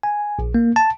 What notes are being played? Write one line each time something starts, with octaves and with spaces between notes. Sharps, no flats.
G#5
A#1
A#3
A5